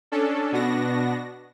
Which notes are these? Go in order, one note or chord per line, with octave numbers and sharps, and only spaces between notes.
C#4 D4 A4
B2 B3 D4 F#4 A#6